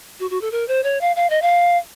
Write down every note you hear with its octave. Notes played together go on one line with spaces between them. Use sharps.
F#4
F#4
A4
A#4
C5
C#5
F5
F5
D#5
F5